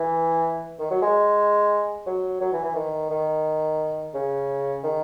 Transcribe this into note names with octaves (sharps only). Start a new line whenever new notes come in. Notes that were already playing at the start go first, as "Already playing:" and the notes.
Already playing: E3
D#3
F#3
G#3
F#3
F#3
E3
E3
D#3
D#3
C#3
D#3